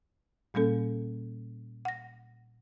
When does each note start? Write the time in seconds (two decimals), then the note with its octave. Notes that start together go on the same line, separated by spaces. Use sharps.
0.54 A#2 G3 A#3 C#4 A4
1.85 F#5 A#6